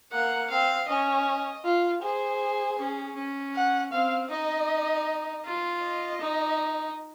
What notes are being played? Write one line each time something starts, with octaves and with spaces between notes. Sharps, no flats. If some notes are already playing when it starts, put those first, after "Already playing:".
A#3 F#5
C4 F5
C#4 D#5
F4
G#4 C5
C#4
C#4
F#5
C4 F5
D#4 D#5
F4
D#5
D#4